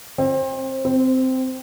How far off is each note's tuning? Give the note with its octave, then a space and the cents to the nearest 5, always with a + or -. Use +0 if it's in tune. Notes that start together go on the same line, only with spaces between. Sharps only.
C4 +30
C4 -10